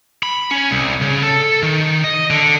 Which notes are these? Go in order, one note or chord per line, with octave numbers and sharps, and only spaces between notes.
B5
C#4
C2
C#3
A4
D#3
D#5
D3